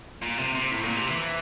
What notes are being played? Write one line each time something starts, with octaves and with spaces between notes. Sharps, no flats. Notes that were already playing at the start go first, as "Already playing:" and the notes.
A#2
C3
C3
A2
A#2
C3
E3